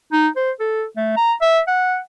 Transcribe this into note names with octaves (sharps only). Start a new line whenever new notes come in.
D#4
C5
A4
A3
A#5
E5
F#5